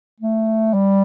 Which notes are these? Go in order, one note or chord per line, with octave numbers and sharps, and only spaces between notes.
A3
G3